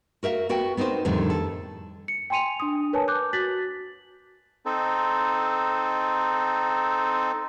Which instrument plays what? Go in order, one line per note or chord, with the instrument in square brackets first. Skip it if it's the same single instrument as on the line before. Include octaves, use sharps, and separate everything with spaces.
[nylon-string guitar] F#4 A#4 E5 F5
B3 F#4 A#4 G5
B3 C4 D#4 A#4 C5
F2 A2 D3 D#3 G3
A4
[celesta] C#7
G5 G#5 C6 C#7 D#7 F7
D4 D#6
A#4 B4 C#5 G#5 A5
D6 F#6 G6
F#4 A6 B6 F#7
[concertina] C4 D#4 A4